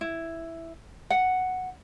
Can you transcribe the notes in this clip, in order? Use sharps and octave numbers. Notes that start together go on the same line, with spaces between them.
E4
F#5